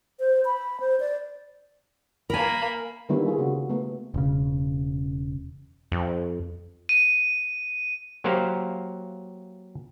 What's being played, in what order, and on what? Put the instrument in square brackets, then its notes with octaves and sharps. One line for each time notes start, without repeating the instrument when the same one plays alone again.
[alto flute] C5
B5
C5
D5
[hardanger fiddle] A#3 B5 [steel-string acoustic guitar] A#4 G#5
[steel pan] D3 D#3 G3 A#3 B3 E4
F4 G#4
C#3 F#4
A3 B3
[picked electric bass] E1 C#3
[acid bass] F2
[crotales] D#7
[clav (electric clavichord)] F#3 A#3 G4 C5 F5 F#5